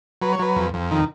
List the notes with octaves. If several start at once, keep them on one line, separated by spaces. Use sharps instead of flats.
F#3 B4
C#5
F#3 B4
F2
F2
D#3